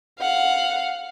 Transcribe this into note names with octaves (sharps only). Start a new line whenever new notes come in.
F5 F#5